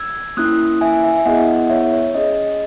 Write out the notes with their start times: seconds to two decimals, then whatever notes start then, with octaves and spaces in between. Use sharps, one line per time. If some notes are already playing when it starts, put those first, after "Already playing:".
Already playing: E6 G#6
0.37 A#3 C#4 E4 D#6 F#6
0.81 E5 G#5
1.04 E5 G#5
1.17 E5
1.26 B3 E4 G#4 D#5 F#5
1.70 C#5 E5
1.93 C#5
2.15 C#4 G#4 D#5